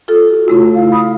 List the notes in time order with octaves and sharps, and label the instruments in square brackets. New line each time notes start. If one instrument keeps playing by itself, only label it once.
[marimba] F4 A4
[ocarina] F#4
[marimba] C#3 A3 E4 [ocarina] F4
[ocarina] F5
[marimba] B5 D#6